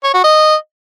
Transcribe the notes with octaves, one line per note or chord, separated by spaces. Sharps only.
C#5
F#4
D#5